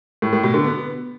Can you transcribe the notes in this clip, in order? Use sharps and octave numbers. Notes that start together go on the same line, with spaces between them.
A2
A2
B2
D3
B3